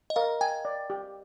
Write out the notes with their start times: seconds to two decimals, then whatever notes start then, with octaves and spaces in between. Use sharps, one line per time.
0.10 D#5
0.16 A#4 F5
0.41 G5 G#5
0.65 D5
0.90 G4